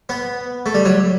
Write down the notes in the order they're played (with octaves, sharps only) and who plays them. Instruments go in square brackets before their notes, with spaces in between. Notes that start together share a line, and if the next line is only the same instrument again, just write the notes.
[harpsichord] B3
A3
G3
F#3